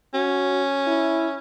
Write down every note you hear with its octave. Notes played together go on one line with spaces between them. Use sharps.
C#4 F#4
E4